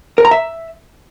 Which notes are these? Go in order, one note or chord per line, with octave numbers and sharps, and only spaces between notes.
A#4
A#5
E5